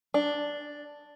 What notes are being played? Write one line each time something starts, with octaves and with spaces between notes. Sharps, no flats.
D4